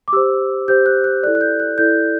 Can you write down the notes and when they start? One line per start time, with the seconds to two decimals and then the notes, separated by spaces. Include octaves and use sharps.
0.08 D6
0.13 G4 C5 E6
0.68 G4 C5 G6
0.86 F#6
1.04 F#6
1.23 E4 A4 D5 F#6
1.35 F#6
1.41 G6
1.60 F#6
1.78 E4 A4 D5 G6